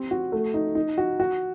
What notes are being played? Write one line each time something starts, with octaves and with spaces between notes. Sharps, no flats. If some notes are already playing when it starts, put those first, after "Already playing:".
Already playing: C4 G4
F#4
A3
D#4
D#4
F#4
F#4